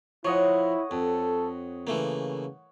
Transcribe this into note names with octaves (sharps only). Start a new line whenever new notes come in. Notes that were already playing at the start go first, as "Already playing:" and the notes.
F3 E4 C#5 D#5 F#5
F2 A4
C#3 E3 A3 A#3